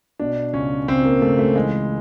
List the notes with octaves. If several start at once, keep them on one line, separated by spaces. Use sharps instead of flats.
B2 D4
C#2 C#4
C#2 C4
A#3
C#2 A3
A3
E3 G#3